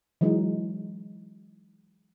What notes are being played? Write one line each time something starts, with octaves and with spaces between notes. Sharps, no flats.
E3 F#3 G#3 D#4